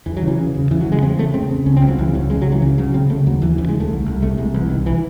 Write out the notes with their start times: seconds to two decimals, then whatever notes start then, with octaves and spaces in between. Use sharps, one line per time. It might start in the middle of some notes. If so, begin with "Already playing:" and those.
0.06 E2 E3
0.17 F#3
0.22 C#3
0.28 E3
0.38 C#3
0.54 C#3
0.71 E2 E3
0.81 F#3
0.86 C#3
0.92 G#3
1.02 E2 C4
1.19 C#3 A3
1.34 C#3 C4
1.51 C#3
1.66 C#2 C#4
1.77 C4
1.82 C#2
1.88 F#3
1.98 C#2 E3
2.14 C#3 F#3
2.30 C#3 G#3
2.42 F#3
2.47 C#2
2.52 E3
2.62 C#3
2.78 C#3 F#3
2.94 C#3 C4
3.10 C#3 A3
3.26 D#2 F#3
3.42 D#2 E3
3.58 C#3 E3
3.69 G#3
3.75 D#2
3.80 A3
3.91 C2
4.06 C2
4.22 C3 A3
4.38 C2 G#3
4.54 C2 E3
4.70 C2 D#3
4.86 E3